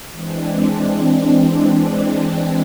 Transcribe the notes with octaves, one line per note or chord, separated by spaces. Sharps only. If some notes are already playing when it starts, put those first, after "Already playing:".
E3 G#3 C4 D4